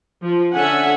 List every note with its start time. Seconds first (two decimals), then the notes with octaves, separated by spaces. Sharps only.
0.23 F3
0.54 D3 C#4 A4 E5 F#5 G#5